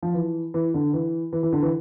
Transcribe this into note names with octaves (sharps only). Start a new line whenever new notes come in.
F3
E3
E3
D3
E3
E3
E3
D3
E3